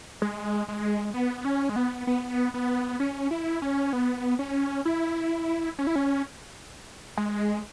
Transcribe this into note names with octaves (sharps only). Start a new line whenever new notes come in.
G#3
G#3
B3
C#4
G#3
B3
B3
B3
C#4
E4
C#4
B3
C#4
E4
C#4
E4
C#4
G#3